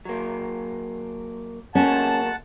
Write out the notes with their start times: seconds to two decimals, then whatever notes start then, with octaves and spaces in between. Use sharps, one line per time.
0.05 F#3 A#3
1.75 F#3 G#3 A#3 C#4 F#5 A5